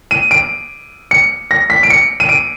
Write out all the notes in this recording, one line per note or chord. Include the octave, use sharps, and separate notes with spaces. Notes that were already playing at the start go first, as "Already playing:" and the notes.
D#7
D7
C#7
A#6
B6
D7
C#7
D#7
D7